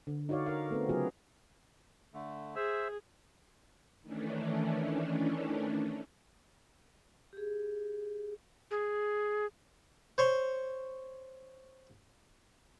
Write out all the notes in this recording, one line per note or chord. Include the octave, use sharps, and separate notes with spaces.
D3
D#4 F#4 C#5 D5 F5
A#4 F5
A3 B3 C4
C#3 F#3 B3 F4 G#4 A#4
D3 A3
G#4 C5 E5 E6
D#3 E3 A3 C#4 D4
G4 G#4
G#4
C5 C#5 C6